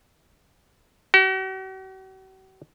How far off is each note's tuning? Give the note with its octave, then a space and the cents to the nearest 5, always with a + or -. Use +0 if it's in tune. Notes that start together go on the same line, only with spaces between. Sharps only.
F#4 +45